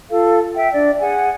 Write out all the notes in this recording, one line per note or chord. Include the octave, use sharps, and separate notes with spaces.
F4 A4 F5
E5 G5
D4 D5
G#4 F#5 G#5